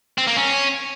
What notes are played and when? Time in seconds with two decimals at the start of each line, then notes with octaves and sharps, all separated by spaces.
0.18 C4
0.27 A#3
0.37 C#4